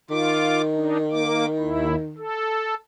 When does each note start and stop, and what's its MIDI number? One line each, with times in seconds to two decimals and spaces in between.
0.10 2.24 51
0.10 0.61 65
0.10 0.61 86
0.75 0.97 62
0.75 0.97 63
1.11 1.46 58
1.11 1.46 86
1.59 1.95 39
1.59 1.95 64
2.18 2.75 69